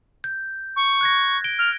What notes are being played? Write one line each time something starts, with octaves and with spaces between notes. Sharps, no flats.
G6
C#6
F#6 G#6 A#6
D7 G7
F6